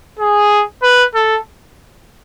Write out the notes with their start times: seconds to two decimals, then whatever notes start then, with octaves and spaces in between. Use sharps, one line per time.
0.19 G#4
0.83 B4
1.15 A4